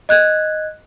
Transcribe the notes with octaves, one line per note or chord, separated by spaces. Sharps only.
D#5 F#6 G#6